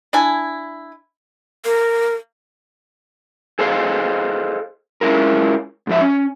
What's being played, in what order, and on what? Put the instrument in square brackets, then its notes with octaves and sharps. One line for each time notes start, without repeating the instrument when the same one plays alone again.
[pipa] D4 E4 G#5
[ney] A#4
[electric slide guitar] G#4 A4 C5 D#5 F5
G#3 C#4 E4 F4 A#4
G#2 F3 E5
C#4